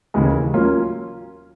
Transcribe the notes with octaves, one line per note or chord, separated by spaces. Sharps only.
D#2 C#3 E3 G#3
F#3 A#3 C#4 F4